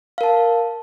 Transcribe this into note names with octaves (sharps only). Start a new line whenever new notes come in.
A#4 F5 A5